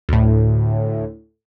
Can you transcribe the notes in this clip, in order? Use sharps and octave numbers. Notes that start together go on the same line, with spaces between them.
D2 A2